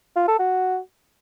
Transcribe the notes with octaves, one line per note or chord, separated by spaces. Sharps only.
F4
A4
F#4